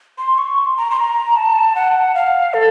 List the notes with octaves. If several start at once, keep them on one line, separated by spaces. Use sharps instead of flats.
C6
C#6
C6
A#5
C6
A#5
A5
F#5
F5
A4